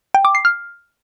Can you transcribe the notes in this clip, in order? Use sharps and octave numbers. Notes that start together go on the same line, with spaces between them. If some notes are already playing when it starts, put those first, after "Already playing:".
G5
D6
C7
F6